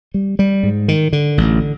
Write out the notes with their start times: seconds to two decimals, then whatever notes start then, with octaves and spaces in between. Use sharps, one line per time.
0.14 G3
0.39 G3
0.63 G#2
0.88 D#3
1.13 D3
1.38 A1